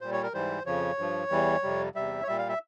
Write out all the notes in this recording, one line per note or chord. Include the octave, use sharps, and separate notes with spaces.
A#2 G3 C5
C#5
A#4
G#2 E3 G3 C5
F2 C#3 F3 C#5
G2 F3
E2 E3 G3
F2 C3 G3
E2 C3 G3 E5
C#5
A#2 G3 E5
F5
E5